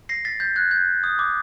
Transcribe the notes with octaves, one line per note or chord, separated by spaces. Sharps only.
A#6 C7
A6 B6
G6 A6
F#6 G#6
G6
D#6
D6